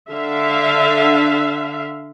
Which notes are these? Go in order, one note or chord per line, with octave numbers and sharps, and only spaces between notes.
D3 E5 F5